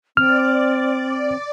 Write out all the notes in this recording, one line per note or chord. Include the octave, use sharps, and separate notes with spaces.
C4 D5 F6